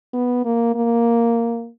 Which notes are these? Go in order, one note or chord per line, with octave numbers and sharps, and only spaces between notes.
B3
A#3
A#3